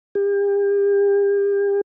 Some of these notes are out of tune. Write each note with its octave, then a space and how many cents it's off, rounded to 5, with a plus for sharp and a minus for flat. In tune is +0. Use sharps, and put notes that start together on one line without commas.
G4 +40